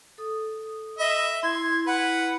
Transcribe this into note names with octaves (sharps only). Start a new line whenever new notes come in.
A4 D#6
D#5 E5 B5
E4 C6 G#6
B4 F#5